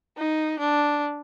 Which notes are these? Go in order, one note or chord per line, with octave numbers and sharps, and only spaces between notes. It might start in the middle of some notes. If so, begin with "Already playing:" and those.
D#4
D4